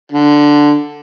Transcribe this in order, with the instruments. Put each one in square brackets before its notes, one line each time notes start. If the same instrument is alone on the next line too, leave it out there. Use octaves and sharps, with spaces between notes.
[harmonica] D3